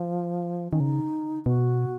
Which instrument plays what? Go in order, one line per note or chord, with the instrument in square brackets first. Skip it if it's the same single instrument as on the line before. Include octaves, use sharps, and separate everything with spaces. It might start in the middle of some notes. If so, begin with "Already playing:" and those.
Already playing: [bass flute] F3
[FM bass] D#3 [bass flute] C#4
[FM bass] C#3 [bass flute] D#4
[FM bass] B2 [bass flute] F#4